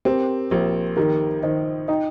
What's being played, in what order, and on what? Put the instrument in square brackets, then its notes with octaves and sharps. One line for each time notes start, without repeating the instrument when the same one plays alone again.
[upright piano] C4 [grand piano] G4 A#4
[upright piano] A#1 [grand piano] G4 A#4
[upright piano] D#3 [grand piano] G4 A#4
[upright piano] D#3 [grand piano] C5 D#5
[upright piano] D#4 [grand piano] D#5 G5